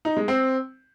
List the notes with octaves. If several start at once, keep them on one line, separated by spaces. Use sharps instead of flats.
D#4
G#3
C4